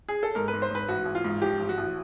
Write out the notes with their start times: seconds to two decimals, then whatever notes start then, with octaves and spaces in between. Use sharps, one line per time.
0.09 G#4
0.23 A4
0.35 G#2 A#4
0.48 B4
0.54 G#2
0.62 C5
0.71 G#2 B4
0.89 A1 F#4
1.06 A1
1.15 F4
1.25 G#2
1.42 F3 G4
1.60 A1
1.69 F#4
1.78 A1